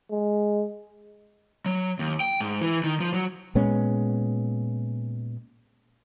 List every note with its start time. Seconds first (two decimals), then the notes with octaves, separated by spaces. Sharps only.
0.11 G#3
1.66 F#3
1.99 D#2
2.20 G5
2.40 G#2
2.61 E3
2.84 D#3
3.00 F3
3.14 F#3
3.55 A#2 G#3 B3 C#4